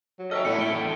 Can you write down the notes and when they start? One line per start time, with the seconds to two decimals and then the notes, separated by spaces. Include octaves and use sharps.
0.19 F#3
0.31 G#2 A4 C#5 D#5 E5 G5 F6
0.45 A2 B3 C#4 E4 A4 C#7
0.58 A3 E4 E5 C#7 D7 G7
0.71 E2 D3 G5